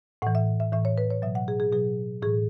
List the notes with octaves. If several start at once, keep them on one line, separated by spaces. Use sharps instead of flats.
A2 E3 F#5
E5
E5
A2 E3 E5
C#5
B4
C#5
B2 F#3 E5
F#5
G#4
G#4
B2 F#3 G#4
A2 E3 G#4